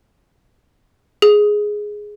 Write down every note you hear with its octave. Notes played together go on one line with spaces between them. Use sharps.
G#4